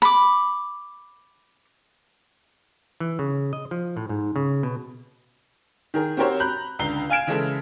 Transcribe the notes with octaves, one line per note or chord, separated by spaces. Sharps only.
B5 D6
E3
C#3
D#5
F3
A2
G#2
C#3
B2
D#3 G#4 A#4
C4 F#4 G4 A#4 C5 C#5
A#5 B5 F#6 G6
C#2 D3 A#5 C7 G7
F5 G#5 F6 G#6 D7 E7
C#3 E3 G#3 C#4 E4 A4